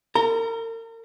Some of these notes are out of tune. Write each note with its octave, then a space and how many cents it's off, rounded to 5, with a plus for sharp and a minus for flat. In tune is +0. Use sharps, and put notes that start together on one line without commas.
A#4 -40 A#5 +0